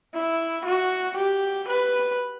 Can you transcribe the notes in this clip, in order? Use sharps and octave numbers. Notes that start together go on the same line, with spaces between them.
E4
F#4
G4
B4